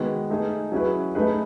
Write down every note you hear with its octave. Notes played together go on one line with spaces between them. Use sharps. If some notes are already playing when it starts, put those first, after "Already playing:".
Already playing: D#3 G#3 B3 F#4
A3 D#4 G#4
F#3 C#4 E4 G#4 B4
A3 D#4 G#4 B4